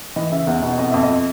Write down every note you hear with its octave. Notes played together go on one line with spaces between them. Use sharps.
E3 D#5
C#3 E5
E2
B2 D#5
F2 D#5
F2 E5
D#5